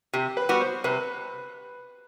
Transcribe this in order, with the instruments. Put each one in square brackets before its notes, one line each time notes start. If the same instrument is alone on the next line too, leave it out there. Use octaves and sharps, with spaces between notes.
[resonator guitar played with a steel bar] C3 [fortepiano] G4
[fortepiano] B4
[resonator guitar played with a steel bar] G3 B3 F#4
[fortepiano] C5
[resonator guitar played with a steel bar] C3 [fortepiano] B4